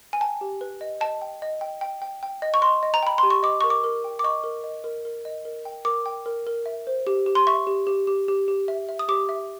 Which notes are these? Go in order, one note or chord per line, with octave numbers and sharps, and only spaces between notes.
G#5
G5 A5
G4
B4
D#5
D#5 A5
G5
D#5
G5
G5
G5
G5
D#5
C#6
D#5 C6
D#5
A#5
G5 B5
G4 C6
C#6
D#5 D6
A#4 C#6
D6
A#4
G5
D6
D#5 C#6
A#4
D#5
A#4
A#4
D#5
A#4
G5
A#4 D6
G5
A#4
A#4
E5
C5
G4
G4
C6
E5 C#6
G4
G4
G4
G4
G4
E5
E5
D#6
G4 D6
E5